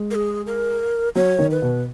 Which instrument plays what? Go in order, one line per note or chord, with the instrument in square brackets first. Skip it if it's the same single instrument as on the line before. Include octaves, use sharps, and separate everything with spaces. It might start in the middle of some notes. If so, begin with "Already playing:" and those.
Already playing: [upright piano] G#3
[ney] A#4
G#4
A#4
[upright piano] F#3 [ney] C#5
[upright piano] D#3
[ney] B4
[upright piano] B2